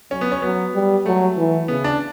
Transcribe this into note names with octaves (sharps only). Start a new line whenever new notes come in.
F#3 C#4
B3
C#4
F#3 B3
G3
F#3 A3
E3
C#3 B3
D4